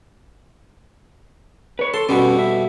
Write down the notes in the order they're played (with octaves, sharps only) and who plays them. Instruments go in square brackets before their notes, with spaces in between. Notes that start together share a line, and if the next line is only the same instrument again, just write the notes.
[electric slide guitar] B4 C#5
[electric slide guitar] A4 [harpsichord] C6
[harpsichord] F2 B2 G3 [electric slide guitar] C#4 B4
[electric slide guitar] E5